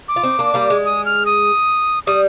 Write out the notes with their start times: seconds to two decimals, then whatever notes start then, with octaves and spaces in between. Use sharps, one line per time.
0.08 D6
0.16 F4
0.23 C4 D#4
0.39 A#3 D4
0.54 G3 A#3
0.70 G#3
0.85 D#6
1.05 F6
1.26 D#6
2.07 G3 D#6